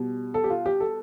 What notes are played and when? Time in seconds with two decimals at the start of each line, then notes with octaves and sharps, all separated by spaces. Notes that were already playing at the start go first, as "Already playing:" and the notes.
Already playing: B2 G3
0.34 A4
0.44 G4
0.50 F4
0.66 G4
0.80 A4